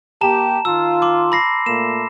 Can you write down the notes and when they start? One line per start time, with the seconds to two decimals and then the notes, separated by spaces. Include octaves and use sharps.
0.21 A#3 G4 A5 A#5 E7
0.65 D#3 F4 E6
1.02 C6 D6
1.32 B5 A#6 C7
1.66 A#2 A3 A#3 E7